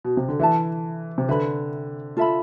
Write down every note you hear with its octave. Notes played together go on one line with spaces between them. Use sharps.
B2
C3
D3
E3 A4 E5 A5
C3
D3 B4 E5 B5
F4 A4 E5 B5